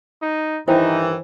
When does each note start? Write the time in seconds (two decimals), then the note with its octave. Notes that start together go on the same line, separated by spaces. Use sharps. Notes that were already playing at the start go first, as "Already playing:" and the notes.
0.22 D#4
0.68 G2 D#3 E3 D#4 E4 C5 G5